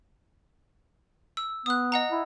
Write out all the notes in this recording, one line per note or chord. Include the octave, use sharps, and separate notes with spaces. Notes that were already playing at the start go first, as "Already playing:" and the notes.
E6
B3 D#6 F#6
D#5 F#5 A#5
E4